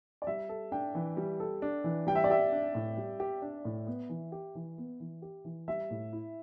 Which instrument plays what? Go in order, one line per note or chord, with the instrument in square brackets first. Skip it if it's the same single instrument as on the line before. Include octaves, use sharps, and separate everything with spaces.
[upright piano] D5
[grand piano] G3 [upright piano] E5
[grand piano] A4
[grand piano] D4 [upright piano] G5
[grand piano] E3
G3
A4
D4
E3
[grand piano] G3 [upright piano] G5
[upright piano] E5
D5
[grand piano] G4 [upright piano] E5
[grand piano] D4
A2
G3
G4
D4
A2
B3
E3
G4
E3
B3
E3
G4
E3
[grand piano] G3 [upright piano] E5
[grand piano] A2
E4